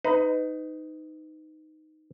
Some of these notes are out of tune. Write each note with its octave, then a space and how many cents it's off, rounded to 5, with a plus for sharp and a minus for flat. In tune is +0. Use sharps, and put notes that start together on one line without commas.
D#4 +0 B4 +30